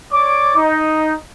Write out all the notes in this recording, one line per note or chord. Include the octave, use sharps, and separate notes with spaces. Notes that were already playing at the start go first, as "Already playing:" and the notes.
C#5 D5 D6
D#4